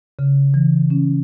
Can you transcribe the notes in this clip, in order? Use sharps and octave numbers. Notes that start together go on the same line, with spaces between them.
C#3
E3
C#4